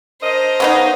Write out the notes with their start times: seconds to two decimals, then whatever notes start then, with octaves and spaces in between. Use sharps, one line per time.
0.23 D4 A#4 C5 D#5
0.60 C#3 B3 D#4